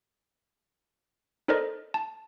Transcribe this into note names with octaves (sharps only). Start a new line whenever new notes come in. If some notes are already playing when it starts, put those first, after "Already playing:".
D#4 A4 A#4 C5 D5 D#5
A5